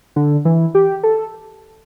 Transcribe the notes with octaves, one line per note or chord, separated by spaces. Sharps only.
D3
E3
G4
A4